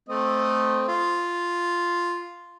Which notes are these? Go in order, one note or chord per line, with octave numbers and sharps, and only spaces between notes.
A3 C4 D#5
F4